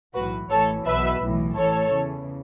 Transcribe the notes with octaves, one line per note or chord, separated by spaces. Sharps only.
B1 A2 E3 F#4 B4
A1 A2 E3 A4 C#5
B1 B2 B4 E5
B1 A2 E3
A1 A2 E3 A4 C#5
E2 C#3 E3